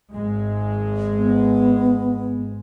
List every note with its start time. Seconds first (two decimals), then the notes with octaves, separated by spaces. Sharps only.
0.12 G#1 G#3
1.17 B3